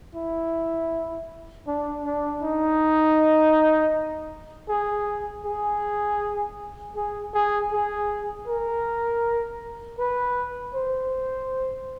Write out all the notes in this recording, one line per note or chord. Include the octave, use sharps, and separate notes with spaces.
E4
D4
D4
D#4
G#4
G#4
G#4
G#4
G#4
A#4
B4
C5